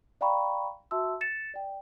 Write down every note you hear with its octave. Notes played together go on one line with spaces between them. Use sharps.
D5 F5 G5 A#5 B5 C#6
F#4 E5 A5 C6 E6
A6 C#7 E7
D5 G5